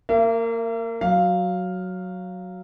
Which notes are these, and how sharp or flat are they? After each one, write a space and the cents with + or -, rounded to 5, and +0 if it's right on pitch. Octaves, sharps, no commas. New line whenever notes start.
A#3 -20 E5 +45
F#3 +0 F5 +0